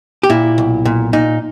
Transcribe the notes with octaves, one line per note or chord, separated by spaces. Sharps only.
G4
A#2 E4
B1
A#2
A#2 D#4